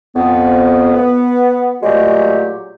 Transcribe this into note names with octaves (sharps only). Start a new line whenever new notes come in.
F2 B3
B3
A#2 F#3 G#3 A3 F#4 G4